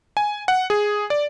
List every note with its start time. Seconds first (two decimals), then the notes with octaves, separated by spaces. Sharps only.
0.17 G#5
0.48 F#5
0.70 G#4
1.10 D5